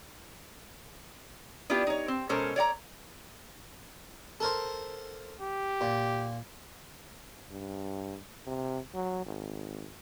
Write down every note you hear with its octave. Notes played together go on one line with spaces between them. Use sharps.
B3 D4 E4 F4 G4
D#4 C#5
C4
B2 G#3 C#4 A4 A#4 C5
C#5 D5 F#5 A#5
A4 A#4 C5
G4
A#2
G2
C3
F#3
G#1